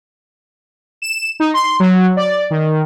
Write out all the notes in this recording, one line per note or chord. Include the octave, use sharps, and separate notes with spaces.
E7
D#4
C6
F#3
D5
D#3